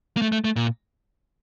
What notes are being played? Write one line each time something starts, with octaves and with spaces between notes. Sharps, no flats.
A#3
A3
A3
A3
A#2